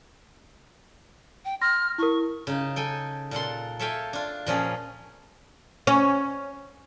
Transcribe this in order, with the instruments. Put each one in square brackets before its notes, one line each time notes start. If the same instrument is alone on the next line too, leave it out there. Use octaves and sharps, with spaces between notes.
[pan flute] G5
[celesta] C6 A#6 [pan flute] F6
[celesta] E4 A#4 [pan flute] C#6
[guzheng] C#3 D#4
A4 G5 G#5
A#2 A4 F#5 C6
A4 C#5 E5 F5 G5 G#5
D4 F4
A#2 F3 C#4 G#4
[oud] C#4